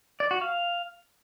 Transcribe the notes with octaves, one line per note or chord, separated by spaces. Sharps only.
D5
F#4
F5